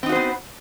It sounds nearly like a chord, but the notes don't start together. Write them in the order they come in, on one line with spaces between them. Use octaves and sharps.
C4 D#4 F#4 C5 B3